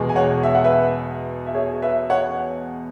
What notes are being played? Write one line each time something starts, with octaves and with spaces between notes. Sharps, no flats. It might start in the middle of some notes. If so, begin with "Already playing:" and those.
Already playing: E2 B2 G#3
G#5
C#5 F#5
E5
F#5
B4 E5
E5
G#4 C#5
B4 E5
C#5 F#5